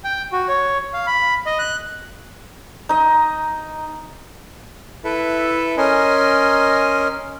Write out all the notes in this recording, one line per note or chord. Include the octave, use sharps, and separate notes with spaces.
G5
F#4
C#5
F5
B5
D#5
F#6
D#4 D#5
E4 A4 B4 E5
C#4 A#4 D#5 G#5 C6